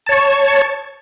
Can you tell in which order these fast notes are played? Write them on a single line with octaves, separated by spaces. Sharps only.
A5 C#5 C#6